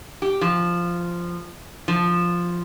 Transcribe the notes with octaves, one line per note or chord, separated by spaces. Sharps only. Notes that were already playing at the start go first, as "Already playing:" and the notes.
G4
F3
F3